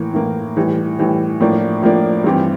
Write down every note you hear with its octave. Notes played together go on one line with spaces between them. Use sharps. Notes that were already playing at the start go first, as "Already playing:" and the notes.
Already playing: A2 E3 A#3
A2 E3 A#3
A2 E3 G3
A2 E3 G3
A2 F3 A#3 D4
A2 F3 A#3 D4
G2 E3 G3 C4 G4